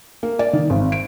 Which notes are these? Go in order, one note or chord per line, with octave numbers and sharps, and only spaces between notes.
A#3
D5
D#3
G#1
D7